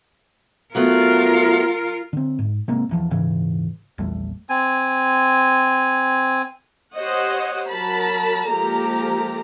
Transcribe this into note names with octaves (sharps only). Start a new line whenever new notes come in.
F#3 A3 B3 F4 A#4
D3 C4
G#2
C3 G#3 A#3 C4
E1 E2 F3
D#1 G#2 C#3 E3
A#1 E2 G3 A3
C4 G#5
G4 C5 C#5 D#5 F#5
F#3 A#4 A5 B5
F3 G#3 A#3 G4 A4 A#5